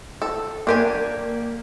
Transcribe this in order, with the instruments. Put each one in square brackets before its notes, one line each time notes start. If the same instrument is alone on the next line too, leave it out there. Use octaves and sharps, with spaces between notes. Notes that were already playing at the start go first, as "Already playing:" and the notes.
[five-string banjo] A4
[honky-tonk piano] A#3 [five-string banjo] D4 G4 G#5